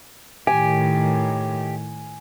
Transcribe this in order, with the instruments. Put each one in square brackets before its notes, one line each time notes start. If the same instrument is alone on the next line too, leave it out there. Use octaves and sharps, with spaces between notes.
[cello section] A2 D#3 [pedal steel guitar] G4 [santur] G#5